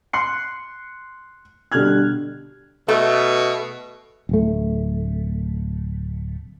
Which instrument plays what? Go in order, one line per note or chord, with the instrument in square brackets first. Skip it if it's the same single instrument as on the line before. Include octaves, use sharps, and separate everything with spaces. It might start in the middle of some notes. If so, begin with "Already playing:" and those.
[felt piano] C6 F#6 C7 C#7
B2 D3 G3 F6 F#6 G#6
[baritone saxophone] B2 [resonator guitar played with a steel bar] A3
[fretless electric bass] D1 A3